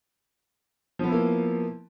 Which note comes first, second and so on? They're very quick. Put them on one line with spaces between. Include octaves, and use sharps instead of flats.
F3 B3 E4 A#3